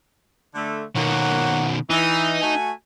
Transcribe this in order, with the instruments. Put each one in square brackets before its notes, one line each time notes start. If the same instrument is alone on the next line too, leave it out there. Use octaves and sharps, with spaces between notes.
[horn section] D3 A3
[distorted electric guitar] B2 D#3 [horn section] A#3 C#5 F#5
[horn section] E3 [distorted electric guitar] D#4
[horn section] A3 F#4 G#5